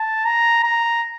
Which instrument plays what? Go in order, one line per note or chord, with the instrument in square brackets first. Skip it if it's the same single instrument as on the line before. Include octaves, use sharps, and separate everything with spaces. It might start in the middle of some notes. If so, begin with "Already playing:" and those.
Already playing: [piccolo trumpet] A5
A#5
A#5